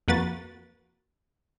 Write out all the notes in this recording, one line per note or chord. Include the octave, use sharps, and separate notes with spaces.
F2 A#3 F#4 B4 A6